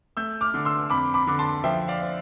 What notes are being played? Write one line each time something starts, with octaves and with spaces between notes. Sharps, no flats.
A3 E6 G6
D6 F6
D3
C6 E6
F2 B5 D6
B5 D6
D3 D6
A5 C6
F3 E5 G5
D5 F5
C4